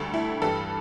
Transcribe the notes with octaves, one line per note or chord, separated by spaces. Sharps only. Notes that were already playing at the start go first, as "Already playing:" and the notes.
Already playing: D2 D3 G3 A4
E4
G2 E3 G3 A4